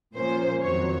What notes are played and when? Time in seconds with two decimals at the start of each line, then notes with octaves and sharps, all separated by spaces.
0.15 A#2 F3 A#3 C#4 C5
0.62 F2 D#3 F#3 C#5